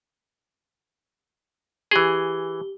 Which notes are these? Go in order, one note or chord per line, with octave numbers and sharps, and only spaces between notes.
E3 G4 G#4 G7